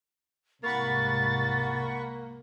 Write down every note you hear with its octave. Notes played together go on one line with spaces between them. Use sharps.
C2 G#2 A#3 F#5 B5 C#6 A6